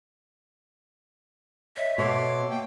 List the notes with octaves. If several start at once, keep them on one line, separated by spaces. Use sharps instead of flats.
C#5 D#5 E5
B2 A4 C#5 E5 F#5 C6 D6
A#3 G5